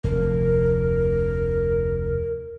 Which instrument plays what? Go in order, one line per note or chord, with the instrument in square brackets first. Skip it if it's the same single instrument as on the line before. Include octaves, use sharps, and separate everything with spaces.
[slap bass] F1 D2 [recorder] A#4